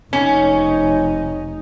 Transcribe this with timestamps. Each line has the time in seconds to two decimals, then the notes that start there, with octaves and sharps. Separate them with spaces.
0.13 F1 C#4 D#4